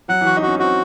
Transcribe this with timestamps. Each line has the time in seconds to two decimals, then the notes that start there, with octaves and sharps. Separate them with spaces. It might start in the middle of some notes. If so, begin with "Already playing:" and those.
0.09 F#3 F#5
0.21 E3 F#4
0.37 D#4
0.42 C#4 F#4
0.59 C4 F#4